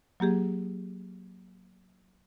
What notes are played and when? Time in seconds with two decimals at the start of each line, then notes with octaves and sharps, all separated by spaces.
0.20 F#3 A#3 G4 G#4